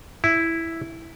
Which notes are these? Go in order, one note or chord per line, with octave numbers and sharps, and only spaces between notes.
E4